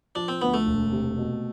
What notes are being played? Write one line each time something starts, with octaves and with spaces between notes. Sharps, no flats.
F3 D4
C4
D2 B3
A3
E1
C3
B2